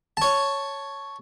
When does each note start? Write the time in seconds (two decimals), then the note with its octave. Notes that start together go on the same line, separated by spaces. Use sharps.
0.17 C#5 A5